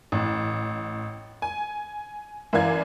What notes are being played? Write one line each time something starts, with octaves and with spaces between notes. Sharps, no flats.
A1
G#5
F#2 E3 D5 F5 G#6